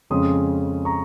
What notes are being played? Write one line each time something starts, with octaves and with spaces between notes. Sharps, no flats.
F2 C#3 G#3 C#4 C6 D#6
A#5 C#6